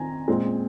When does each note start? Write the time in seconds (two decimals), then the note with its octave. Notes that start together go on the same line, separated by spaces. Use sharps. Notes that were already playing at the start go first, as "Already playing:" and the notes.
Already playing: D#3 C4 G#5 A#5
0.28 A#2 G#3 C4